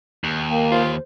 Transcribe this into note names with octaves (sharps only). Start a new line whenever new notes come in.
D#2
A#3 G5
F4 C5